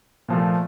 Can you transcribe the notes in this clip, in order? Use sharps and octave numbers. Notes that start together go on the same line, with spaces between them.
A#2 F3 A3